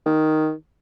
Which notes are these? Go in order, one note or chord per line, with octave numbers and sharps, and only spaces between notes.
D#3